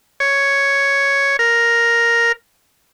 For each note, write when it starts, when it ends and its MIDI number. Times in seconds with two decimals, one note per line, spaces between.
0.20 1.36 73
1.39 2.32 70